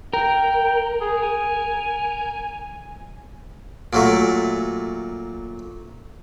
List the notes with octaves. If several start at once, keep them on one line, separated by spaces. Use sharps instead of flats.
A#4 G5
G#4
G#5
A#2 F#3 A3